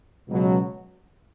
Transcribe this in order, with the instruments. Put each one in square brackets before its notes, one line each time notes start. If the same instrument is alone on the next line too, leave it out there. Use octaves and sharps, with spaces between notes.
[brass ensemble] C#2 B2 F#3